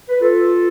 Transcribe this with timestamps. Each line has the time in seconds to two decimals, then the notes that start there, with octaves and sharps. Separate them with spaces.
0.09 B4
0.21 F4 A4